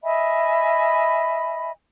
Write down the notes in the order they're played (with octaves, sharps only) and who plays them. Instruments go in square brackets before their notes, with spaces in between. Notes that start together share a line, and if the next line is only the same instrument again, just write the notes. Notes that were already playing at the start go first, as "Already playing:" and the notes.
[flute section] D#5 E5 G#5 B5